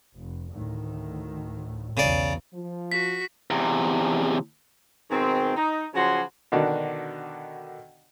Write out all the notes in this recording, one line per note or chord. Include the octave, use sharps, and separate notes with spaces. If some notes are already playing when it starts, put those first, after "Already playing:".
F1
D2 A2 D#3
B1 E2 C#3 D5
F3
F#4 B6
E2 C3
G#2 B2 D#3 C4
D#4
C#3 F3 F#3 F#4 G#5 C6
B2 D3 D#3 D4 F#4